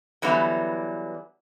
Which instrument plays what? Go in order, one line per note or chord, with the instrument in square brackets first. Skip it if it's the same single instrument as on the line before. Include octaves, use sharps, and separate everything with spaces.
[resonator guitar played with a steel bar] D3 E3 F#3 G3 B3